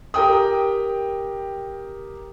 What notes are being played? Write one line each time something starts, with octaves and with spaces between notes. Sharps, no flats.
G4 A#4 G5 D#6